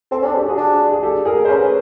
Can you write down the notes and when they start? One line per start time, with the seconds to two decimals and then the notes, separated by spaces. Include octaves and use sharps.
0.11 C4 A4
0.22 C#4 D4 G#4
0.36 G4
0.48 F#4 G#4
0.57 D4
0.92 G#4
1.03 G4 A4
1.25 G#4 A#4
1.45 C5
1.48 C#4 A4 B4